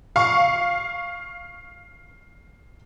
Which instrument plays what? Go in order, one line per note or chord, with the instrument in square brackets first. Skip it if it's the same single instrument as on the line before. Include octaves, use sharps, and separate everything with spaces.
[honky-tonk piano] F5 C#6